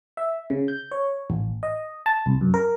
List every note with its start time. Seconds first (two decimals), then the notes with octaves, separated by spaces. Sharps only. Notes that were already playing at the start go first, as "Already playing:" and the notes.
0.17 E5
0.50 C#3
0.68 G6
0.91 C#5
1.30 A1
1.63 D#5
2.06 A5
2.26 C2
2.41 F#2
2.54 A#4